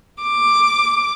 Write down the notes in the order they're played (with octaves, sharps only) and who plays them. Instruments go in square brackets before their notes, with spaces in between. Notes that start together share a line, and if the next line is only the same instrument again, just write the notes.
[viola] D6